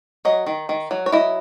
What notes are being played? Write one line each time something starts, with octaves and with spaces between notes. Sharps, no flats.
F#3 D#5
D#3
D#3
F#3
C#5
E4 D#5